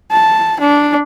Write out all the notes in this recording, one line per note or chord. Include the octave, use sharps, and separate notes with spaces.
A5
D4